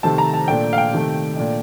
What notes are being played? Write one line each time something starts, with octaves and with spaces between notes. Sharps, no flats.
C3 D#3 A3 C4 A5
A#5
A5
A#2 A3 D4 G5
F5
G5
C3 D#3 A3
A#2 A3 D4